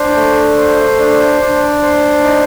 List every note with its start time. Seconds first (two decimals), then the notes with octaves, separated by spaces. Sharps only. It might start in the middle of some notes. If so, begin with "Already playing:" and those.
Already playing: D4 C5
0.15 A3
0.57 C5
0.99 D4
1.41 D4
1.82 C5
2.23 D#4